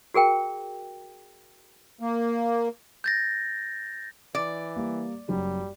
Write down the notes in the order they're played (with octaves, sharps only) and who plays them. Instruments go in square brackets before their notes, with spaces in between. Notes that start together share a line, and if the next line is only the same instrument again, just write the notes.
[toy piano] F#4 G#4 A#4 G5
[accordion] A#3
[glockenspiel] G6 A6 A#6
[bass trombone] E3 [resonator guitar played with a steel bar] D5
[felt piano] G3 A#3
[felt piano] F#1 F#2 F#4 [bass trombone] G3